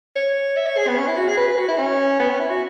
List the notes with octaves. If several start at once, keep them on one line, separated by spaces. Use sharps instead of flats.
C#5
E5
C#5
G#4
B3
C#4
E4
F#4
G#4
B4
B4
F#4
E4
C#4
B3
C#4
E4
F#4